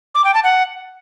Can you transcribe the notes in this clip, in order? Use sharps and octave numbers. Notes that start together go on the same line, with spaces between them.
D6
G5
A5
F#5